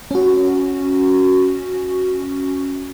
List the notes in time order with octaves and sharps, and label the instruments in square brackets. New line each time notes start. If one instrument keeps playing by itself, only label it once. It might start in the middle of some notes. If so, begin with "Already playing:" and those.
[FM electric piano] C#4 F#4